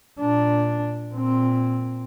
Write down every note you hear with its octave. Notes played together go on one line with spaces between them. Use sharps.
A#2 D4
A#2 C4